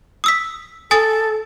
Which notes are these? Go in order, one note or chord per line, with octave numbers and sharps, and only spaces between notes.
D#6 E6 B6
A4 G#5 D#6 A6